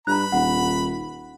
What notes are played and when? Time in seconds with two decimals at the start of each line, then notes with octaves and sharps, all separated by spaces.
0.07 G2 A#5 B5 F#6
0.32 D#1 F#5